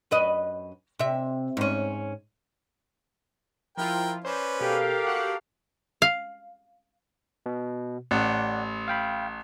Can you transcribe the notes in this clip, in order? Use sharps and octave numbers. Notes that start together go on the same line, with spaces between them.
F#2 B4 D#5
C3 E5
G#2 C#4
F3 E4 F4 A#4 G5
C#4 B4 C5 D5
B2 G4 A4 A#4 F5
F#4 F#5 F#6
F5
B2
A1 D5 F#5
F5 G5 B5